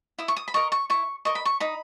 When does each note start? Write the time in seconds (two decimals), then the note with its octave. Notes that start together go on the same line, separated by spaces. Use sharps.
0.19 E4 D#6
0.28 C#6
0.36 D#6
0.48 B5
0.54 A#4 D#5 C#6
0.72 C#6
0.90 E4 C#6
1.25 A#4 D#5 C#6
1.35 B5
1.45 C#6
1.60 D#4 B5